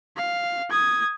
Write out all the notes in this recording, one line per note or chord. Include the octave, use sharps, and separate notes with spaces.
F5
D#6 G#6